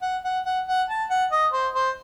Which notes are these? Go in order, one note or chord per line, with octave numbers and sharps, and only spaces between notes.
F#5
F#5
F#5
F#5
A5
F#5
D#5
C5
C5